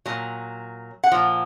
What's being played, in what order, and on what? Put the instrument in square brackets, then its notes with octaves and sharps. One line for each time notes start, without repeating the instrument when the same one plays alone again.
[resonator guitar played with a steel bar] A#2 F#3
F#5
A#2 F3